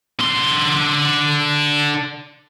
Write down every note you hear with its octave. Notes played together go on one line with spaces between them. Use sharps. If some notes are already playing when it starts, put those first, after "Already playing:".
D3 C6